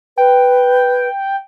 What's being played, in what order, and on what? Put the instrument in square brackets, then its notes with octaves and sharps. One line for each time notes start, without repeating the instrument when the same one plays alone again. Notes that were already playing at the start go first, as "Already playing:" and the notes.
[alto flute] B4 [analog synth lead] G5